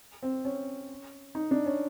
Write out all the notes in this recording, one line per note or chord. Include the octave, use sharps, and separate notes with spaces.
C4
C#4
D#4
D4
C#4